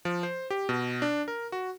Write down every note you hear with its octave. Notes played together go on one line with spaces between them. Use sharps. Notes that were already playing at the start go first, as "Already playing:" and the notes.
F3
C5
G4
B2
D4
A#4
F#4